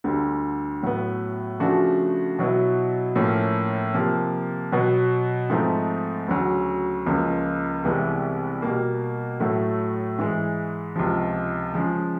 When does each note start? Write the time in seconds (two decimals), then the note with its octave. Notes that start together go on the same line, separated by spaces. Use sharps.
0.04 D2 D3 G3
0.83 A2 F#3 B3
1.60 C#3 F3 A3 D4 F#4
2.39 B2 F#3 B3 E4
3.16 A2 F3 A#3 C#4 E4
3.94 C3 F3 A#3
4.72 B2 F#3 B3
5.50 G#2 F3 A3 C4 D#4
6.28 D2 C#3 F#3
7.06 C#2 C#3 F3 A#3
7.84 C2 C3 E3 G#3 B3
8.62 B2 G3 A#3
9.40 A2 F#3 A3
10.19 G#2 E3 G#3
10.96 C#2 C3 F3
11.74 C#3 F3 G#3